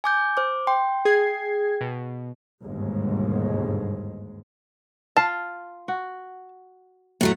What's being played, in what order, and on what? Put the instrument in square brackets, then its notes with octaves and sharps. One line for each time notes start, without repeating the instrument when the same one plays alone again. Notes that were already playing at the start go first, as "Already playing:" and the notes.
[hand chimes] G#5 D6 G6
C5 D6
[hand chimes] G5 [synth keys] C6
[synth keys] G#4 G#6 C7
B2
[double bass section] G1 D#2 G#2 B2 G#3
[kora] F4 F5 [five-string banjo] A5
[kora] F#4
[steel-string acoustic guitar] A2 F#3 A3